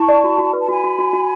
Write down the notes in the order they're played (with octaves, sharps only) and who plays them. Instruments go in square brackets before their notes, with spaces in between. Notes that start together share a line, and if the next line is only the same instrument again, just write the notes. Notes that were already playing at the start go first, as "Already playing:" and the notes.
Already playing: [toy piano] E4 [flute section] A5 C#6
[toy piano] D5
F#4
F#4
B4
[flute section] A5
[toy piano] F#4 [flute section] G#5 B5
[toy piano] F#4
F#4
F#4